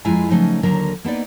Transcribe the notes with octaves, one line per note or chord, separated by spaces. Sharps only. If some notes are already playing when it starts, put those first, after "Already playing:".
F2 G#3 E4 F4 G#5 A#5
C#3 F3 F#3 A3 D#4 G#5
D#2 D3 F#3 A#4 A#5
A#3 B3 D#4 D5